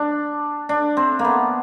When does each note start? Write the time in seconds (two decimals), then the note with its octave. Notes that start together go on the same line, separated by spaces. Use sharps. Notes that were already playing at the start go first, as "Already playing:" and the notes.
Already playing: D4
0.69 D4
0.97 C4
1.19 A#3
1.25 B3